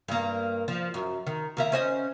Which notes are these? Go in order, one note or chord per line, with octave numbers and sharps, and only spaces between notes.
G2 A#3
F3
F#2
D#3
D#2 A#3 E5
C#4 C5 D#5